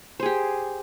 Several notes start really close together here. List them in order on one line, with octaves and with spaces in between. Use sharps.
C5 G#4 G4